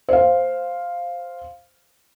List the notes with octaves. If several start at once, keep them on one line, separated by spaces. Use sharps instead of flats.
C5 F5